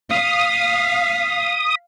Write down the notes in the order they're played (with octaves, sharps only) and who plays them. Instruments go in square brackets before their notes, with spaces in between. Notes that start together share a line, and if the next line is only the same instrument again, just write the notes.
[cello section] F5 [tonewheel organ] D#6 [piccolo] B6